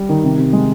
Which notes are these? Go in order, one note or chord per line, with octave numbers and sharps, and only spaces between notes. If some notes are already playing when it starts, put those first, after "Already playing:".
Already playing: G3
D#3
C3
C3
G#3